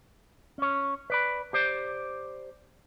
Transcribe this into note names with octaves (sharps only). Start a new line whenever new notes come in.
C#4 C#5
B4 D5 B5
G4 C5 D5